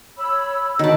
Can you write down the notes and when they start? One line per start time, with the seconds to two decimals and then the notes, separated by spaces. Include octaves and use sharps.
0.17 C#5 B5 E6
0.79 D#3 F#4 G5 A5 B5